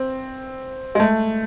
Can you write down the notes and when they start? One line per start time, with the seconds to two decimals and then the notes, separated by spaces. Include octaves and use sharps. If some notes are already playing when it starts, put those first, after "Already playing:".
Already playing: C4
0.95 G#3
1.00 A3